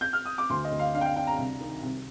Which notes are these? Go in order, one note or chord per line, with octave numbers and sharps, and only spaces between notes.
G6
F6
D#6
D6
D2 C6
D#5
D2
F5
D4 F5
G5
F5
D4 G5
A#5
C2
D#3
C2